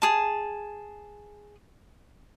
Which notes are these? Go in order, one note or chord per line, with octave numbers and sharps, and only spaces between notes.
G#4 A5